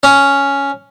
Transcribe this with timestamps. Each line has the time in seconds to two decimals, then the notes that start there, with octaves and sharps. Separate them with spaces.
0.03 C#4